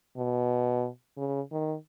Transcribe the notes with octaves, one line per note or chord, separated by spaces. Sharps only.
B2
C#3
D#3